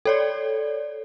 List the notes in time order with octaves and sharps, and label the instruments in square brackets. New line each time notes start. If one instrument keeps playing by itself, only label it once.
[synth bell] A4 C#5 D5